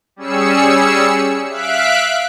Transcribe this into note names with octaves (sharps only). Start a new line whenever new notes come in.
G3 C#4 G#4 E6 C#7
E5 F5 F#6 B6 D7